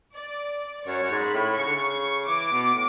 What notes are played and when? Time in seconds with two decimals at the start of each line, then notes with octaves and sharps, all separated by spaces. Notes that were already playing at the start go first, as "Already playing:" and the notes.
0.16 D5
0.87 F#2 C#5
1.02 F#2
1.11 G#2
1.23 B5
1.33 A2
1.57 C#3 C#6
1.66 D3
1.75 C#3
2.28 E3 D6
2.52 B2
2.74 A2